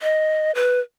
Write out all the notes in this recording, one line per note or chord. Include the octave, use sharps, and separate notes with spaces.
D#5
B4